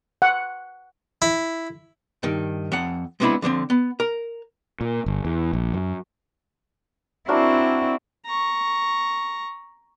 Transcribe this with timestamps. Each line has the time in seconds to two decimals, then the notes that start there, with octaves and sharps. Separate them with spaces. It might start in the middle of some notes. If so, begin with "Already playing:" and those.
0.22 F#5
1.22 E4
2.23 G2 D#3
2.72 F2 F#5
3.20 G#3 B3 C4 D4 E4 B5
3.42 D3 F3 A#3 C4
3.70 B3
4.00 A#4
4.81 A#2
5.06 G1
5.25 E2
5.53 A#1
5.73 F#2
7.28 C4 D4 E4 F#4 A#4
8.26 A#5 C#6